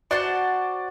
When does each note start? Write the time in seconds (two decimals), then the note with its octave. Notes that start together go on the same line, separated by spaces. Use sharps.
0.11 F#4 C5 D5 F#5 A5